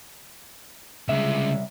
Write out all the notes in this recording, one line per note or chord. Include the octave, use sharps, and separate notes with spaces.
C2 G2 C#3 G#3 E5